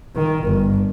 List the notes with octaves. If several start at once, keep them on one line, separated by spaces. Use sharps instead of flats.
D#3
G1